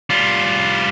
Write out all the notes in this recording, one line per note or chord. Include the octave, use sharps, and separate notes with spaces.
G3 F4